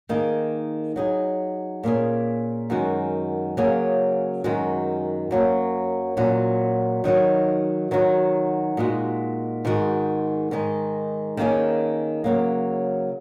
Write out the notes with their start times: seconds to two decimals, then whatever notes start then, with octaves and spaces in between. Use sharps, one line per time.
0.09 D#3 A#3 D#4 G#4
0.96 F#3 D#4 G#4
1.83 A#2 A#3 C#4 G#4
2.70 F#2 D#3 G#3 F#4
3.57 C#3 F#3 A#3 C#4 G#4
4.44 F#2 D#3 G#3 F#4
5.31 F#2 F#3 A#3
6.17 A#2 F#3 C#4 F#4
7.04 D#3 F#3 D#4 F#4
7.91 D#3 F#3 D#4 F#4
8.77 A#2 G#3 D#4 F#4
9.65 G#2 D#3 G#3 F#4
10.51 G#2 D#3 G#3 D#4
11.37 D#3 A#3 C#4 G#4
12.24 C#3 F#3 A#3